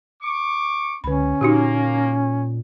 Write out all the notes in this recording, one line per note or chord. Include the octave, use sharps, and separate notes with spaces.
C#6 D6
C#2 D3 C#4 B5
A#2 A#3 D#4 F#4 G4